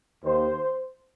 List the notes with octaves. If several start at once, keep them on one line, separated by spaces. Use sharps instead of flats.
D#2 D#3 A#3 C5